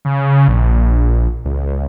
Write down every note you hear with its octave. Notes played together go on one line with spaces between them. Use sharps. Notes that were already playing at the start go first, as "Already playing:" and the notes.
C#3
A#1
C#2